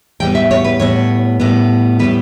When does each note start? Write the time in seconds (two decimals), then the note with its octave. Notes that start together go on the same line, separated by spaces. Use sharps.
0.20 A2 G3 B3 G5
0.35 E5
0.51 C#5
0.65 B4
0.80 A2 G3 B3 C#5
1.40 A2 G3 B3
2.00 A2 G3 B3 B4